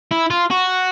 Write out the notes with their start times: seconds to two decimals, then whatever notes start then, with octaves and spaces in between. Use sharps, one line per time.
0.11 E4
0.31 F4
0.51 F#4